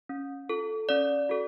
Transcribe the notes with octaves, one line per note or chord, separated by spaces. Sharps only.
C#4
F4 A4
C#4 D5
F#4 A4